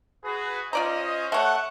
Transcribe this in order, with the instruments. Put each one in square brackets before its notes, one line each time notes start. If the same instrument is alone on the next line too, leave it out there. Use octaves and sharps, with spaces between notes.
[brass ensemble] F#4 G#4 B4
[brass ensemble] C#4 C5 D#5 [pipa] F4 D5 A#5
[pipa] A3 C#5 [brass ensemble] F#5